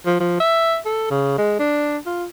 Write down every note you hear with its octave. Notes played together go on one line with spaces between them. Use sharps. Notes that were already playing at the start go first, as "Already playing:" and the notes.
F3
F3
E5
A4
C#3
G#3
D4
F4